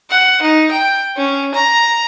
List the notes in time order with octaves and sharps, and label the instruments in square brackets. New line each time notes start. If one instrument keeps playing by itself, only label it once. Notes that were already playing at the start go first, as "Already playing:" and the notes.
[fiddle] F#5
D#4
G5
C#4
A#5